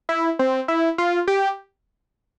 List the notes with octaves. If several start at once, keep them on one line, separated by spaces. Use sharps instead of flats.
E4
C4
E4
F4
G4